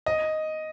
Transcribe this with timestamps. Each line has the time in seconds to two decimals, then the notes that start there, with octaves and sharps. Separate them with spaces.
0.06 D#5